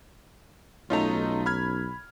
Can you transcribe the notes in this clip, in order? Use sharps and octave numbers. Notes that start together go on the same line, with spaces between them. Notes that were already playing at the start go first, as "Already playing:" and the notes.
B1 A3 C#4 D#4 F4 A#5
B5 F6 G#6